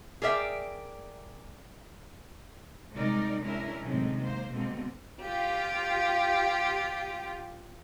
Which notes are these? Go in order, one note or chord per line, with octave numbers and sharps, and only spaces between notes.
G#4 A#4 D5 E5 G5
C3 G3 G#3 D#4 A#4 D5
G#3 C#4 D4 E4 A#4
F#2 A2 C3 D#3 G#3 C4
G#2 A#3 C5
B2 D3 G3 G#3 A#3 C4
F4 G4